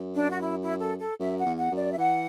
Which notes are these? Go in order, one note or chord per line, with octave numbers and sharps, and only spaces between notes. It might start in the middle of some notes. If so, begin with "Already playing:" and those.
Already playing: F#2
D4
F#4
E4
E4
A4
A4
F#2 E5
F#5
E2
F#5
F#2
D5
E5
E3 F#5